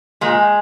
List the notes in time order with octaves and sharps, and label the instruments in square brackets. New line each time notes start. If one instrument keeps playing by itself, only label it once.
[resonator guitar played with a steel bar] A#2 G#3